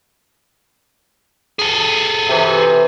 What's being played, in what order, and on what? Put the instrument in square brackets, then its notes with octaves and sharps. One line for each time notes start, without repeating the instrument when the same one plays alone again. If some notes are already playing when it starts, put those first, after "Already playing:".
[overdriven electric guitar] G#4 A4
[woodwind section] C3 E3